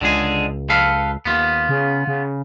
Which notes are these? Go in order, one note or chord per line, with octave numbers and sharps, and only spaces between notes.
C#2 D3 G#3 G#4
A4 B4 F5
D#2 B3 F4
C#3
C#3